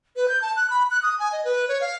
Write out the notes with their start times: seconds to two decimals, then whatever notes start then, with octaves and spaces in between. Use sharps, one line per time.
0.16 B4
0.29 G6
0.42 A5
0.56 F#6
0.70 B5
0.91 F#6
1.03 D#6
1.19 G#5
1.32 D#5
1.45 B4
1.68 C#5
1.81 F5